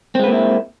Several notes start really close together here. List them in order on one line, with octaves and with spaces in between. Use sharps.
C4 G#3 B4 A#3 E4